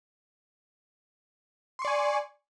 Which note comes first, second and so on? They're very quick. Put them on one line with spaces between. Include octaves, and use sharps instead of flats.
C6 C#6 D5 G#5